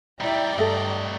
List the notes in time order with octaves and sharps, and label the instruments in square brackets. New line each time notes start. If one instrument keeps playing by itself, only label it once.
[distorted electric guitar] G3 D#4 [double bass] E4 [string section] D5 G5 A#5
[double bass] G2 [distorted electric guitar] A3 D#5 [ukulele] A4 E5